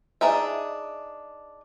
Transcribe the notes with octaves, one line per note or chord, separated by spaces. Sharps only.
D4 D#4 G#4 E5